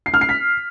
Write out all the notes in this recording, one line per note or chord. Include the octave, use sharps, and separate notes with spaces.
C7
F6
C7
B6